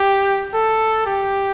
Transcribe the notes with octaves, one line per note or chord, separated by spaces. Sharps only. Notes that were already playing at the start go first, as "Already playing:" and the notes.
Already playing: G4
A4
G4